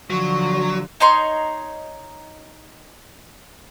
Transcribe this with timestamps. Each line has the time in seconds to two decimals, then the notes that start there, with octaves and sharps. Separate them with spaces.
0.10 D3 F3 F#3 C#6
1.00 D#4 C#5 A#5 C6